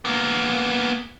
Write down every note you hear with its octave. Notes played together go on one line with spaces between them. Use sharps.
A#3 B3